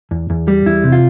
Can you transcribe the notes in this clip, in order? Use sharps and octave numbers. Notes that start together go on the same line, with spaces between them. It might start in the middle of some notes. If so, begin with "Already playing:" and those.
E2
E2
G3
E2 E4
C3
F4